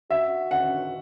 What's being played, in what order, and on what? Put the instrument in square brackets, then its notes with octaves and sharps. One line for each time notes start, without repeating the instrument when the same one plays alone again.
[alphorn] F#4 [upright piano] E5
[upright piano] F#5